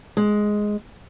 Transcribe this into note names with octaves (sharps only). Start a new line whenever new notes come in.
G#3